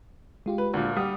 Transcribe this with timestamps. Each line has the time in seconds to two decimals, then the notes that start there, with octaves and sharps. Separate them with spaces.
0.46 G#3 F4 G4
0.58 B4
0.74 D2 A#2
0.97 G3 F#5 D#6